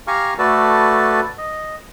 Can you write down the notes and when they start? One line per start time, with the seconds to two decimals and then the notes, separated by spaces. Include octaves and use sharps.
0.07 G4 F5 G#5 A#5 C#6 F6
0.39 A3 F#4 A4 B4 D5 A5
1.38 D#5